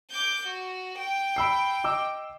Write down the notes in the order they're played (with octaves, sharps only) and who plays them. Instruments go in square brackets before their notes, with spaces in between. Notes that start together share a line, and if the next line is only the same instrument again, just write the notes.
[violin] D6 G6
F#4
G5
[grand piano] B5 E6 C7
D#5 D6 E6